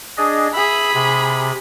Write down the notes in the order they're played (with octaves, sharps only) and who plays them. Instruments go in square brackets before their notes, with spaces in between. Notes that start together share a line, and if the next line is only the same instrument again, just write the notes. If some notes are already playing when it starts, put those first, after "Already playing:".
[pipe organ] D4 G#4 D#5
[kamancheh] G#4 B5 [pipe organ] E5
[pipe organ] C3